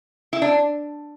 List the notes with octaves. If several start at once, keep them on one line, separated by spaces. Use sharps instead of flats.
E4
D4